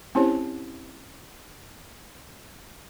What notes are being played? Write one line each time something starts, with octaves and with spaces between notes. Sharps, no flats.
C4 C#4 E4 G4 C5 C#5